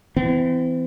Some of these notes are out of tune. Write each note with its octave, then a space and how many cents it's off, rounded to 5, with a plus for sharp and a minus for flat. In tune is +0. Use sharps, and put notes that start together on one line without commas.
E3 +0 C4 -40